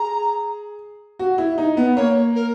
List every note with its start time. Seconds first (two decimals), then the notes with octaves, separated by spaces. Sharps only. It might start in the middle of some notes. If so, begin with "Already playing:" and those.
Already playing: G#4 A#5
1.19 F#4
1.38 E4
1.58 D#4
1.77 B3
1.96 A#3 C#5
2.35 A#4